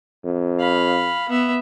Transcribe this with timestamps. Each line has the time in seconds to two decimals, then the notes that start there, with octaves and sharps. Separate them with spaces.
0.25 F2
0.60 F5 B5
1.29 B3 E5